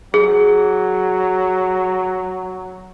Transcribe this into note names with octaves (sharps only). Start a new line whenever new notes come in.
F#3 G#4